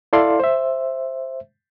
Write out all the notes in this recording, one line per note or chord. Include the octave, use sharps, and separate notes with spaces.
E4 A4 D5 F5 C6
C5 E5